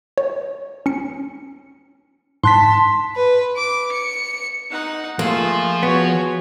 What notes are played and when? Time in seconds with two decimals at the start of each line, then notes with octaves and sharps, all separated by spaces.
0.18 C#5
0.86 C#4 C#7
2.44 G#2 A5 C6 F#6 B6
3.16 B4
3.57 D6
3.92 C#7
4.70 D#4 F#5
5.19 F3 A3 A#3 F4 G#4 F5
5.83 B3 F#4 C#5